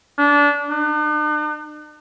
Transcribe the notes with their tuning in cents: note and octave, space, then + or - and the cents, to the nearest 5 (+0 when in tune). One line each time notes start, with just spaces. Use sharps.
D4 -25
D4 +45